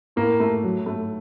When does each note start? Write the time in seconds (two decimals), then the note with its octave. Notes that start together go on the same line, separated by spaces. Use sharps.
0.16 A2 A#3
0.40 A3
0.63 F#3
0.86 A3